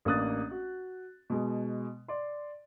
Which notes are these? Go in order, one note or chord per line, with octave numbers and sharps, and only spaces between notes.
A1 A#3 D4 D#6 F#6 A6
F#4
B2 G#3
D5 C6